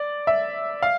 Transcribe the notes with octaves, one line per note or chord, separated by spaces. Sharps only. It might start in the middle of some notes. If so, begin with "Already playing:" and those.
Already playing: D5
E5
F5